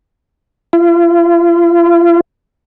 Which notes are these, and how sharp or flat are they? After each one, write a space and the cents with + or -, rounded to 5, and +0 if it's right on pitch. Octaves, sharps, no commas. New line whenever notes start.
F4 -40